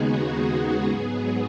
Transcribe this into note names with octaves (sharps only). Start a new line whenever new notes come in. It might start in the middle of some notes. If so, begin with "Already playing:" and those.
Already playing: D#2 C#3 G#3 B3 D#4 F#4 G#4
G#4
G#2 F#3 B3